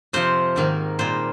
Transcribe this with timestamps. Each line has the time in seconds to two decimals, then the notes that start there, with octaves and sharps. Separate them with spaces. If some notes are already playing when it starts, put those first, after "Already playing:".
0.13 F2 C3 F3 C4 C5
0.56 G#2 D#3 A#3
0.99 A#2 G3 A#3 C5